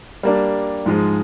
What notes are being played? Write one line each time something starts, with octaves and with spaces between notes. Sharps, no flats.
G3 A#3 D4
G#2 F3 G#3